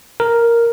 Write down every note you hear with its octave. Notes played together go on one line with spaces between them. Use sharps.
A#4